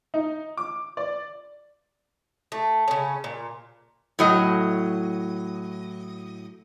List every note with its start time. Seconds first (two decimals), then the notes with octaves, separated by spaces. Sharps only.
0.14 D#4
0.57 D6
0.97 D5
2.52 A3
2.88 C#3 C#4
3.24 A#2
4.19 A2 F#3 D#5